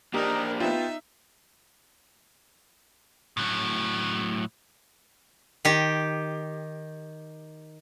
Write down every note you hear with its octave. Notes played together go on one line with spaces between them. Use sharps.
A#3 D4 D#4 G4 A#4
B3 D#4 F4 E5 G5
A2 F#3
D#3 G4